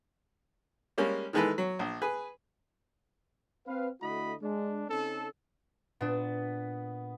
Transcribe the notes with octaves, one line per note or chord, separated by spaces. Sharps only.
G3 G#3 A#3 C#4
D#3 E3 G#3 G#4 A4 B4
F#3
A#1
G#4 B4
C4 B4 F5
D3 A3 E4 F#4 D#5 B5
G#3 D4
C#3 C4 C#4 D#4 A4
A#2 B3 D4 E7